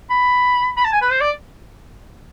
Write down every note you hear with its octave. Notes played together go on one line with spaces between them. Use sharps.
B5
B5
A5
G#5
B4
C5
D5